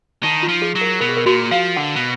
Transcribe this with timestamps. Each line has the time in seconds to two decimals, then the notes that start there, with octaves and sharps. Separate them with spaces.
0.23 D#3 D#4
0.43 F4
0.49 F3
0.62 G#4
0.75 F#3
0.81 A#4
1.00 B2 A#4
1.09 G#4
1.17 A#4
1.26 A#2 F#4
1.51 F3 F5
1.76 D3 F#5
1.96 B2